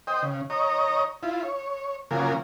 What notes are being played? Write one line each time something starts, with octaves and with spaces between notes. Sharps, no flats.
C5 D#5 G5
C#3
C#5 D#5 A#5
E4 F4
C#5
C#3 F#3 A#3 F4 A#4 G#5